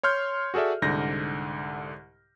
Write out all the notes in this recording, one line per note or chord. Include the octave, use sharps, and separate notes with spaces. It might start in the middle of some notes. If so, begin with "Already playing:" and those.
C#5 C6 F6 G6
F#4 G#4 A4 D5 E5
C2 G#2 D3 G6 A#6